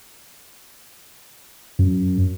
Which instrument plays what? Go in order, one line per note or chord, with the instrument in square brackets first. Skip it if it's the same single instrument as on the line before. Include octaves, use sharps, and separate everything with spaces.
[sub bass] F#2